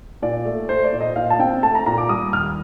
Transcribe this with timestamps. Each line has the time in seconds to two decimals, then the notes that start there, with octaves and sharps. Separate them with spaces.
0.22 A#2 D5
0.46 A3
0.69 A3 C5
0.85 D5
0.93 A#2
1.01 D#5
1.16 A#2 F5
1.30 A5
1.39 C4 G5
1.63 A3 A5
1.75 A#5
1.86 A#2 A#5
1.98 D6
2.09 G3 D#6
2.33 D#2 F6